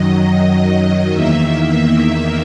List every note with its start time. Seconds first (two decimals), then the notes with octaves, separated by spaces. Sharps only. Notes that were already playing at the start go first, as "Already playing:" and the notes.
Already playing: F#2 D#3 F#3 D#5
1.10 E2 D#3 A#3 E5